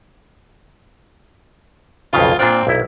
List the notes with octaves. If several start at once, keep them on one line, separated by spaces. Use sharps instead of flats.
B1 F2 C#3 F4
A#2 C4 D4 F4
B1 E4